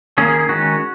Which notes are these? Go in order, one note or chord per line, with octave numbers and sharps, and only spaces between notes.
D#3 A#3 C#4 G#4
G#4
G#4
D#3 G#3 C#4 F#4